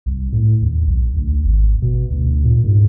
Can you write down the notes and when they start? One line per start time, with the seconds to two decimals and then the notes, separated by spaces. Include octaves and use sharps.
0.06 C2
0.33 A2
0.62 D#2
0.87 B1
1.13 D2
1.45 G#1
1.82 B2
2.11 D2
2.44 A#2
2.64 G#2